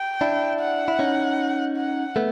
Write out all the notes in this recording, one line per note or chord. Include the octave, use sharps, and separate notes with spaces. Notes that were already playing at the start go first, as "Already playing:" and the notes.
Already playing: G5
D4 E4
F#5
E4
C#4 D#4
F#5
A3 B3